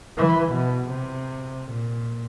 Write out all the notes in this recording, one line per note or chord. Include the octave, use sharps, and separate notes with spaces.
E3
B2
C3
A#2